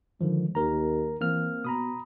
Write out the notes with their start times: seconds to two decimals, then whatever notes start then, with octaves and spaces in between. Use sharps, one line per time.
0.21 D3 D#3 F3 G#3
0.55 D#2 A#4 A#5
1.21 E3 A#3 C4 F6
1.65 B2 A#5 B5 D#6